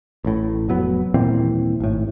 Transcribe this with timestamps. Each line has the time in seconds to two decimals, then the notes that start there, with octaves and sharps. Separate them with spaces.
0.24 A1 A2
0.69 F1 F#3 B3
1.14 D#1 A#2 E3 C4
1.80 G#1 A2